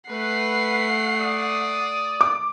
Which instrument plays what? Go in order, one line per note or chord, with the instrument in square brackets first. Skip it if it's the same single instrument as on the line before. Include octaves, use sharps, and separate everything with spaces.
[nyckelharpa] A3 [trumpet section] B4 [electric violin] F#5 C7
[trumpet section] D5 D#6
[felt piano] D6